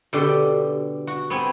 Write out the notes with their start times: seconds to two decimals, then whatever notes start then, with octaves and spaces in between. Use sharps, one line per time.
0.13 B2 D3 G4
1.07 F#4
1.30 B3 C4 G#5